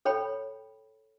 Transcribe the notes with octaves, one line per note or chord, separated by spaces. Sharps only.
A4 C#5 G5 B5